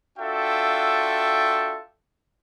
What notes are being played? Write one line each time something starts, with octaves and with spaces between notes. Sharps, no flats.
D4 F4 F#4 A4 E5 G5